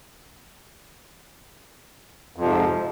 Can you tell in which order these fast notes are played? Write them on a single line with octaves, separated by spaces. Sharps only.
F2 F3 C3 G#2